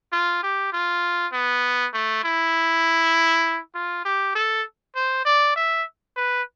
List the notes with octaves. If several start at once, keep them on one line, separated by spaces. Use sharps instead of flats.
F4
G4
F4
B3
A3
E4
F4
G4
A4
C5
D5
E5
B4